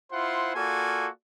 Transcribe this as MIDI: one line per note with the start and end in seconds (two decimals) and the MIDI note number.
0.12 0.52 64
0.12 0.52 65
0.12 0.52 72
0.12 0.52 78
0.12 0.52 84
0.55 1.08 58
0.55 1.08 65
0.55 1.08 66
0.55 1.08 69
0.55 1.08 74
0.55 1.08 80